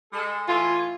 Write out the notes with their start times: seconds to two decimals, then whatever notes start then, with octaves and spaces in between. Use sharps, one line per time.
0.13 G#3 A4
0.48 A2 E3 F4 G#5